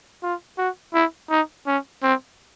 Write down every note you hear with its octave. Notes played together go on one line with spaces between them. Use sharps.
F4
F#4
E4
D#4
C#4
C4